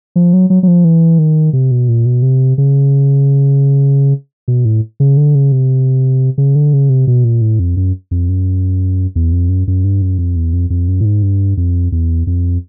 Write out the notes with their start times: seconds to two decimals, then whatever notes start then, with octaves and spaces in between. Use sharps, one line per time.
0.16 F3
0.33 F#3
0.50 F#3
0.63 F#3
0.68 F3
0.85 E3
1.19 D#3
1.53 C3
1.71 B2
1.89 A#2
2.06 B2
2.22 C3
2.58 C#3
4.48 B2
4.65 A2
5.00 C#3
5.17 D3
5.35 C#3
5.52 C3
6.38 C#3
6.55 D3
6.73 C#3
6.89 C3
7.07 B2
7.24 A#2
7.41 A2
7.59 F2
7.77 F#2
8.11 F2
8.29 F#2
9.16 E2
9.32 F2
9.49 F#2
9.67 F#2
9.84 G2
10.02 F#2
10.18 F2
10.36 E2
10.53 F2
10.70 F2
10.88 F#2
11.00 A2
11.05 G#2
11.23 G2
11.57 F2
11.92 E2
12.27 F2